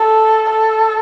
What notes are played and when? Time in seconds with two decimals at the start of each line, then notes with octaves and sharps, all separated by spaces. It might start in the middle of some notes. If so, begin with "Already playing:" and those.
Already playing: A4
0.50 A4